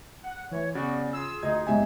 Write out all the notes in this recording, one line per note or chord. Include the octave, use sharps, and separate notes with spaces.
F#5
E3 A3 C#5
C#3 B3 F#4 D5
F4 G#4 E6
D2 D#4 G#6
B1 G#2 G4 E5 G#5